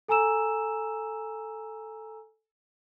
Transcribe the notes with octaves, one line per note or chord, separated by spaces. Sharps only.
A4 G#5 A#5 E6 E7